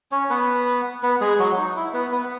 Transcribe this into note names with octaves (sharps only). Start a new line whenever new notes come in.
C#4 C#5
B3 B4
B3 B4
G#3 G#4
F#3 F#4
D#4
E4
B3 B4
B3 B4